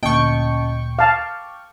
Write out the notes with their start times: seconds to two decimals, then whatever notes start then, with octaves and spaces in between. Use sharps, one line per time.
0.03 D2 A#2 C#4 D#5 G5 A5 C#6
0.99 F5 A5 D6 F6